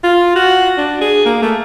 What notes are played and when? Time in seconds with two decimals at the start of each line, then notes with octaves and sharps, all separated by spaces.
0.04 F4
0.36 F#4
0.78 D4
1.01 G#4
1.25 A#3
1.42 A3